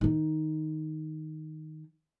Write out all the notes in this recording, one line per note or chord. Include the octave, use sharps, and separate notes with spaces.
D#3 D#4